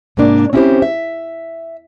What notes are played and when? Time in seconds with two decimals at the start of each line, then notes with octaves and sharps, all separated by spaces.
0.17 G#2 C3 A#3 D4
0.53 C4 C#4 E4 F#4 G4 C5
0.82 E5